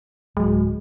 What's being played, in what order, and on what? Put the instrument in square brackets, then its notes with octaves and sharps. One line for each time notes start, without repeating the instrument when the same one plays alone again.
[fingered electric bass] D1 F#3 [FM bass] G#3